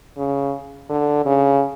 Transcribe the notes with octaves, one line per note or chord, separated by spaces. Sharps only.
C#3
D3
C#3